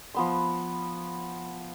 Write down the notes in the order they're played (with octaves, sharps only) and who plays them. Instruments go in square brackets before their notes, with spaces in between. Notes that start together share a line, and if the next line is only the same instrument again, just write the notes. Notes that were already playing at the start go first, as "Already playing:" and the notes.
[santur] F3 B3 C6